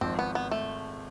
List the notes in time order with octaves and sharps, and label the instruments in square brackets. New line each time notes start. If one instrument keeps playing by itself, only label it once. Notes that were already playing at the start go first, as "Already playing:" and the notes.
[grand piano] G#1 G#2 F3 [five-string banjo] C4
[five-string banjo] B3
B3
A3